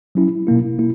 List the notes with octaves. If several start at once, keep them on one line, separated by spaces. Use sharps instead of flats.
F#3 C#4 E4
B2 A#3 E4
B2 A#3 E4